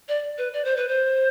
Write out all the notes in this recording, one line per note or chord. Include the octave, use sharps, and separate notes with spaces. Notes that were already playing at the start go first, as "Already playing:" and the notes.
D5
B4
D5
C5
B4
C5